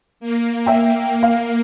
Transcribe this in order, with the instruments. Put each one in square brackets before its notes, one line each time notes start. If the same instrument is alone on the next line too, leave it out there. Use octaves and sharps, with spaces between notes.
[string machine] A#3
[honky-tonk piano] E5 G5
F5